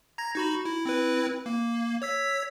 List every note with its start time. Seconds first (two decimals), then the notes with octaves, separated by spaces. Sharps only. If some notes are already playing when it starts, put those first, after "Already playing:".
0.18 A#5 G#6 A#6
0.35 D#4 F#4 B5
0.65 E4
0.85 C4 E4 B4
1.46 A#3
2.02 C#5 E6 B6